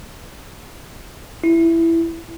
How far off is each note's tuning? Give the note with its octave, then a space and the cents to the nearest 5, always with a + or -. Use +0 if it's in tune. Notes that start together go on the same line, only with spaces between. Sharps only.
E4 +10